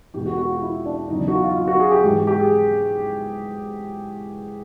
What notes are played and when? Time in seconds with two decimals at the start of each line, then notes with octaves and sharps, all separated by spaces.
0.14 E2 B2 G#3 G4
0.26 F#4
0.38 F#4
0.50 F4
0.62 E4
0.85 D4
1.08 E2 C#3 F#3 D#4
1.21 D4
1.28 F#4
1.33 F4
1.44 F4
1.57 F4
1.67 F#4
1.80 G#4
1.91 G4
2.03 G#2 E3 G#3 G4
2.15 G4
2.27 G4
2.40 G#4